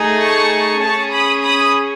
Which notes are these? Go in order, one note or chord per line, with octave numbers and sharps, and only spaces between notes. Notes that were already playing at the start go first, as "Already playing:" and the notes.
Already playing: A3 D#4 G#4
A5 C#6
C#4 G#4 A5 C#6
B5 D#6
B5 D#6